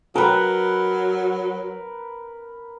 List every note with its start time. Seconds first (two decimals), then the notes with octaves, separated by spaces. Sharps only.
0.16 F#3 A#4 B4